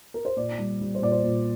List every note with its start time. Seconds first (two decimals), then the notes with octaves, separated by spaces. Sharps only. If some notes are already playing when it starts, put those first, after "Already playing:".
0.14 A#4
0.25 C5
0.36 A#2 D5
0.58 G3
0.81 G3
0.95 C5
1.02 A#2 D5
1.11 C5
1.23 A#2